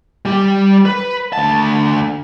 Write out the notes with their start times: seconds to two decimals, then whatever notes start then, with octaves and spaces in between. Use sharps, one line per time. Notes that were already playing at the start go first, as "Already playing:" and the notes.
0.26 G3 G4
0.86 B4
1.33 D2 A5